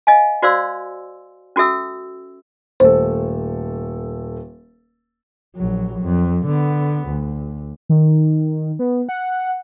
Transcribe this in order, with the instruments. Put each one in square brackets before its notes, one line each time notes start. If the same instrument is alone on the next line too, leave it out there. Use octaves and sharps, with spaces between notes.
[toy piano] D#5 F5 G#5
F#4 C5 D5 F5 C6 E6
C#4 F#4 A4 E5 E6
[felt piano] D#1 A3 A4 [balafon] C5
[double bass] A#1 F#3
F2
D3 B3
D2
[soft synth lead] D#3
B3
F#5